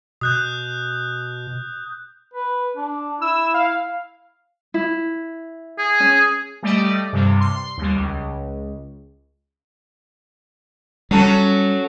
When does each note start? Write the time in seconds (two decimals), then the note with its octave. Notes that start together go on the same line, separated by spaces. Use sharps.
0.21 B2 D#6 F#6 G6
2.34 B4
2.77 D4
3.22 E4 E6
3.54 F5
4.74 E4
5.78 G#4
6.00 C#4
6.63 G3 A3 G4 D5 D#5
7.13 G2 C3 G3
7.40 C6
7.77 D#2 G3
7.96 C#2
11.11 F#3 G3 C#4 A4